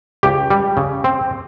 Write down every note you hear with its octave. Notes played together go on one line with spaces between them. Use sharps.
C#2 G4
G3
C#3
C4